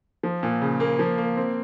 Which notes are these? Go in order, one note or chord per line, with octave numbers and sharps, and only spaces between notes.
F3
A#2
C#3
A#3
F3
A#3
C4